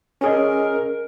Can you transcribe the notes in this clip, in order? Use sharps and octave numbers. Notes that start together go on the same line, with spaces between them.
C#4 G#4 A#4 D#5